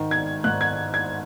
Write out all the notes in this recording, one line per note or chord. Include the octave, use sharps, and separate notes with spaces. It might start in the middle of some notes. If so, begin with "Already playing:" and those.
Already playing: G#2 D#3
G#6
G#2 D#3 F#6
G#6
G#6